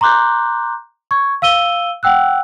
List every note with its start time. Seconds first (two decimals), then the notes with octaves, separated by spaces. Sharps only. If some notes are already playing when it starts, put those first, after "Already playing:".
0.01 A#5 C6 D6 F#6 G6
1.11 C#6 G#6
1.42 F5 E6 D#7 G7
2.03 F#5 G5 E6 F#6